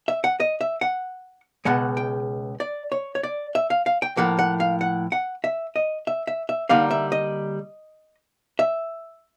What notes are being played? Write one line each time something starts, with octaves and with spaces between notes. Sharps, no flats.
E5
F#5
D#5
E5
F#5
C#2 B2 G#3 F#5
G5
D5
C#5
C#5
D5
E5
F5
F5
G5
A2 F3 A#3 F#5
F#5
F5
F#5
F#5
E5
D#5
E5
E5
E5
D3 G3 A#3 D#4 F5
E5
D#5
E5